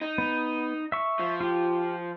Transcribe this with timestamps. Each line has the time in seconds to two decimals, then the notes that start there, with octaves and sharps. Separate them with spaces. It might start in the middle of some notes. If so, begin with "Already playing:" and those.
0.01 D#4
0.18 B3
0.92 E5 C#6
1.19 F3
1.41 F4 G4